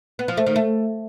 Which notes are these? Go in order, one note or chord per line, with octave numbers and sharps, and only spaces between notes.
B3
F3
A3
D#3
A3